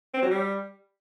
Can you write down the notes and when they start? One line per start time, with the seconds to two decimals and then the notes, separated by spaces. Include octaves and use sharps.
0.14 C4
0.22 F#3
0.31 G3